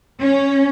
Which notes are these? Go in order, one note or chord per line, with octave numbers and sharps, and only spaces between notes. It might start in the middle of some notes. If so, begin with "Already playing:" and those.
C#4